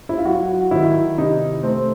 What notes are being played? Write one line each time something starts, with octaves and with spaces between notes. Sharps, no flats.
E4
F4
F#3 F#4
D#3 E4
C3 D#4
A3 C4